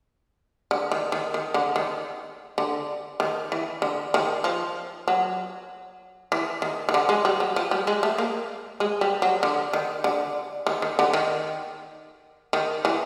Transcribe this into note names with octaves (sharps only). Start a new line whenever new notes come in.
D3
D#3
D#3
D#3
D3
D#3
D3
D#3
E3
D3
D#3
F3
F#3
E3
D#3
D#3
D3
G#3
G3
F#3
F3
G3
G#3
A3
A#3
G#3
G3
F#3
D3
D#3
D3
D#3
D#3
D3
D#3
D#3
E3